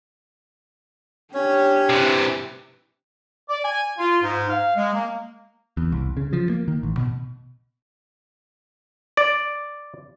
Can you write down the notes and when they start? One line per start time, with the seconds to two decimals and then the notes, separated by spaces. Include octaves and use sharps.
1.34 C#4 D4 G4 C#5
1.90 C3 E3
3.49 D5
3.64 G#5
3.98 F4
4.22 G#2
4.49 F5
4.76 G#3
4.94 A#3
5.77 E2
5.92 C2
6.17 C#3
6.33 F3
6.50 A#3
6.68 D#3
6.83 A1
6.97 B2
9.17 D5